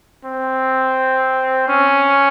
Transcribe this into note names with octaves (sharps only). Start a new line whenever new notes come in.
C4
C#4